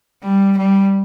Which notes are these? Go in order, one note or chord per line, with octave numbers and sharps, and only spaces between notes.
G3
G3